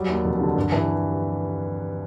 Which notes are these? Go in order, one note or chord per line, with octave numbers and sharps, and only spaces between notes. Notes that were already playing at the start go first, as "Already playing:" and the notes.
Already playing: F#3 G3
D#2
F1
D3
G2
E3